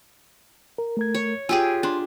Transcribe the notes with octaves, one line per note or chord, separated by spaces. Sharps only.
A#4
A3 A#4 G#6
C#5
F4 G4 G#4 G#5 E6
D4 G#4 C6